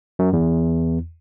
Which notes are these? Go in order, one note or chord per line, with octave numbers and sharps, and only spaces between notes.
F#2
E2